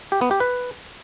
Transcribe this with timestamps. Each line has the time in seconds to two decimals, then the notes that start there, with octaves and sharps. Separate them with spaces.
0.12 G4
0.21 B3
0.31 G4
0.40 B4